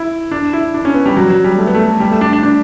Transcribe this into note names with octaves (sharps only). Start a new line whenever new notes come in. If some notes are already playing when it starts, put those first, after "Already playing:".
Already playing: E4
D4
E4
D4
C#4
B3
G3
F#3
F#3
G3
A3
B3
A3
G3
A3
D4
D4
D4